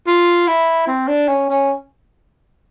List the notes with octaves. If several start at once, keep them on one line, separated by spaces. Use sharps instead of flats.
F4
E4
C4
D4
C#4
C#4